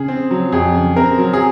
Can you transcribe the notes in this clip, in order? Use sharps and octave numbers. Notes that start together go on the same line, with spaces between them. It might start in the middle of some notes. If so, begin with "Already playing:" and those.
Already playing: C#3 G#4
C4
F#3
F2 G#4
C#3
C4 A#4
F#3
G#4